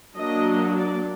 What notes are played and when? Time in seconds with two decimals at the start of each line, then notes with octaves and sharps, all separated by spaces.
0.17 F#3 A#3 D4 D#5
0.77 D5